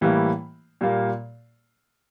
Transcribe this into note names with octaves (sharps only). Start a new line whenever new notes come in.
A2 E3 G3 A#3
A#2 G3 A#3